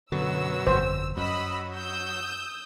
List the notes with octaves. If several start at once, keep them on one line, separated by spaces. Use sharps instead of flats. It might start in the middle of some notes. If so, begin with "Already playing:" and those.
F#2 B2 D3 F#3 E6
G1 F2 C5
F#2 F#3 D#5 B5 E6
D#6 E6 G6